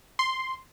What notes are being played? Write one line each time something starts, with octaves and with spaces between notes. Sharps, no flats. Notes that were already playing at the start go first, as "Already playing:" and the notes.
C6